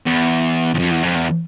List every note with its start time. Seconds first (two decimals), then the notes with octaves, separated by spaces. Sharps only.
0.06 E2
0.74 E2
0.79 F2
0.91 E2
1.03 F2
1.15 E2